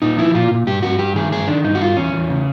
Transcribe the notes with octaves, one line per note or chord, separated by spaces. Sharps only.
A#2 D#4
F3 E4
A#2 F4
A#2
G2 G4
G2 F#4
G2 G4
D#3 G#4
G2 G#4
D#3 D4
G2 D#4
F#4
G2 F4
E2 C#4
E2
C#3